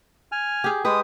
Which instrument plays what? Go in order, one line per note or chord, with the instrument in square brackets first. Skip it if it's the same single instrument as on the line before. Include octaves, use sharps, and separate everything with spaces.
[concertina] G#5 F6
[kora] G4 G#4
[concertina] G#3 D#6 [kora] G4 B4